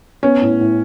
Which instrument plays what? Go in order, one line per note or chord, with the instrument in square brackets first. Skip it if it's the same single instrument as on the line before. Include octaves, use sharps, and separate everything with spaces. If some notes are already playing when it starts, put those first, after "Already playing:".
[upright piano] B3 [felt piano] C#4
[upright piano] A2
A2